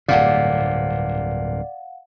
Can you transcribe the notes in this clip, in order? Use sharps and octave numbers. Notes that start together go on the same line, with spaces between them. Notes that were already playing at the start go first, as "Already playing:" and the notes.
D1 G2 A#2 D5 F5 F#5